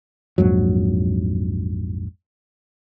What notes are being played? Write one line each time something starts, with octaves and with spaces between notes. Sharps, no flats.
A#1 F2 G#2 F#3